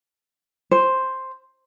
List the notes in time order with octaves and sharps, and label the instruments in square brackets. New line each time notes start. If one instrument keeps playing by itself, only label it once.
[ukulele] C5